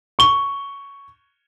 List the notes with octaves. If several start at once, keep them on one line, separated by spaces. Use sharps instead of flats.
C#6 G7